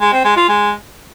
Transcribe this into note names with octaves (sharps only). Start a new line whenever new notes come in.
G#3
C4
G#3
F4
G#3